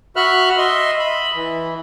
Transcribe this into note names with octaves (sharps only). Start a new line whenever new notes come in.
F#4 E5 B5 F6 F#6
D#5 E5 C6
B5
E3